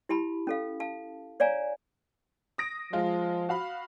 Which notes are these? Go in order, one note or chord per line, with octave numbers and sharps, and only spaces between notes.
E4 G4 A5 B5
C#4 A4 F5
F5 A5
C#5 D5 F5 G#5 A#5
D#6 A#6 D7
F3 G#3 F4
F#4 F5 B5